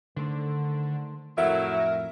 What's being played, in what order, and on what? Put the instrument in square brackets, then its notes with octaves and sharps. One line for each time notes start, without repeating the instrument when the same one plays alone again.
[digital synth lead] D3 [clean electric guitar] D#3 A3 C5
[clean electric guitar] F2 A2 [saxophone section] F#3 A3 E4 [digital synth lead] A#4 [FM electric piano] E5